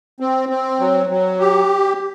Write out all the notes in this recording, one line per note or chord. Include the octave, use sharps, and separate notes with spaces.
C4
C4
F#3
F#3
G4